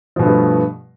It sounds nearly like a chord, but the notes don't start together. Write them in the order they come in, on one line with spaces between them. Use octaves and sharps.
F3 B2 G2 A3 B3